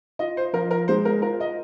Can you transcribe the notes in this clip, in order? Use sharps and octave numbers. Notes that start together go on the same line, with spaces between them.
F4 D#5
C5
F3 A#4
A#4
G#3 C5
A#4
F4 A#4
D#5